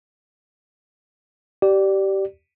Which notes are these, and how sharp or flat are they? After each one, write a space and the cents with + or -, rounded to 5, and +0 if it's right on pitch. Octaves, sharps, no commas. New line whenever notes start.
G4 -20 D5 +5